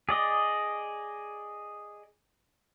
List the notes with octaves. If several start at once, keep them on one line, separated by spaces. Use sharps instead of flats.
G#4 D5 D#5